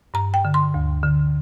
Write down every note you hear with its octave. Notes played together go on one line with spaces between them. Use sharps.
G2 A#5
G5
D3
C6
D2
D3